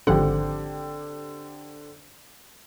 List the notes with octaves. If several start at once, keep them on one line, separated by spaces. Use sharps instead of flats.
G#1 D3 F3 C4 G4 F#5